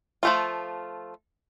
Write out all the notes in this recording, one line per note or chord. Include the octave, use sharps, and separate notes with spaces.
F3 A3 F4